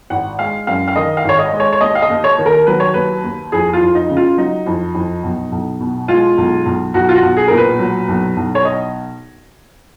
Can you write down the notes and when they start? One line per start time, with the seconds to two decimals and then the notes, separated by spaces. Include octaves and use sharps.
0.10 G#1 F#5
0.39 G#3 F5
0.67 F#2 F5
0.88 F5
0.96 D#3 D#5
1.17 F5
1.24 G#1 C#5
1.39 D#5
1.53 G#3
1.60 C#5
1.73 C#5
1.81 D#2 D#5
1.95 F5
2.02 D#5
2.10 D#2
2.24 C#5
2.38 D#3
2.46 A#4
2.67 F#3 B4
2.80 C#5
2.94 D#2 B4
3.24 D#2
3.52 F2 G#4
3.73 F4
3.81 F2
3.95 D#4
4.09 C#3
4.17 F4
4.38 F#3 D#4
4.66 F2
4.95 F2
5.23 B1
5.52 B1
5.80 B2
6.08 G#3 F4
6.37 B1
6.65 B1
6.94 B1 F#4
7.09 F4
7.15 F#4
7.22 B1
7.37 G#4
7.48 A#2 A#4
7.58 B4
7.79 F#3
8.08 B1
8.36 B1
8.55 C#5
8.65 D#5